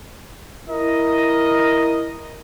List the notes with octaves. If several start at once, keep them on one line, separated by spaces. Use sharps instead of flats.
E4 A#4 D#5